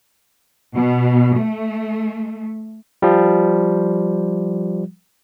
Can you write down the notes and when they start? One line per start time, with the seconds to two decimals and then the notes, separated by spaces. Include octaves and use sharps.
0.73 B2
1.35 A3
3.02 F3 G3